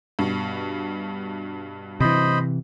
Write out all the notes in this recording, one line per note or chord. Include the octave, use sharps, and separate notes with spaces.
G2 B2
C3 E3 C5 D#5 B5